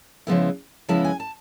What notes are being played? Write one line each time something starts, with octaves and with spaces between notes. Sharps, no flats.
C#3 F3 G#3 B3 E4
C#3 F3 G#3 B3 E4 A5
G#5
A5